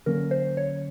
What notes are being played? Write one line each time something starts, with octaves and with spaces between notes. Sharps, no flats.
D3 F#3 A#3 C#4 A#4
C5
C#5